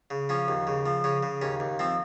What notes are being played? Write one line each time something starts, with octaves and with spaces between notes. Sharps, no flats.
C#3
F3 C#4
D#2
C#3
F3
C#3 C#4
C#3
D#2 C#4
D#2
F3 C4